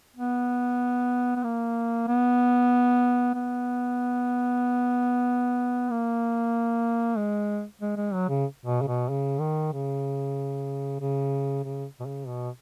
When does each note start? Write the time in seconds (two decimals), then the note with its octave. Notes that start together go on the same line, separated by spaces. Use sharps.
0.16 B3
1.36 B3
1.44 A#3
2.08 B3
3.34 B3
5.90 A#3
7.17 G#3
7.81 G#3
7.97 G#3
8.13 F#3
8.28 C#3
8.65 B2
8.82 C#3
8.88 B2
9.09 C#3
9.40 D#3
9.72 C#3
11.00 C#3
11.63 C#3
12.00 B2
12.06 C#3
12.27 B2